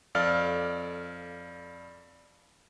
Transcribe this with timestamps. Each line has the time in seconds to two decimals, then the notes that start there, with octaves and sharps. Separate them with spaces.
0.15 F2 A4 D5 F5 F6